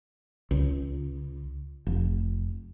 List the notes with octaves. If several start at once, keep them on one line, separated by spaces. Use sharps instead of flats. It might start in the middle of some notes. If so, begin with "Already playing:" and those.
C#2
F1